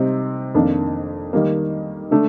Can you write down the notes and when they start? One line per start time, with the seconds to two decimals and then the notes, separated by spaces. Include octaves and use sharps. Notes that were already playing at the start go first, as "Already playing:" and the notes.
Already playing: C3 G3 C4 D#4
0.55 F2 D#3 A#3 D4
1.33 D#3 G3 A#3
2.11 D3 A3 D4